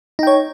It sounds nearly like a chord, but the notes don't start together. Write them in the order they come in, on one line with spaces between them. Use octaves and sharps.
D#4 G5 C#5